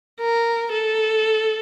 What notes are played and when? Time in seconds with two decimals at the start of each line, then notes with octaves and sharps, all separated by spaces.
0.20 A#4
0.72 A4